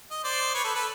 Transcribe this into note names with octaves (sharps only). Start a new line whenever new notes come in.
D#5
C5 D5
B4 C#5
A4 B4
A4 B4